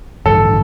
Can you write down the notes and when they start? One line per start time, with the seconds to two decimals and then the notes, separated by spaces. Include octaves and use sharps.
0.26 A1 G2 D3 A4